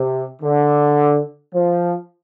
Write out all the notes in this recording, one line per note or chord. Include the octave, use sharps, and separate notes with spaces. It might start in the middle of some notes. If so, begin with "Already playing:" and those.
Already playing: C3
D3
F3